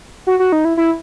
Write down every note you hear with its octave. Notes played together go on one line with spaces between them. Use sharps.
F#4
F#4
D#4
E4
E4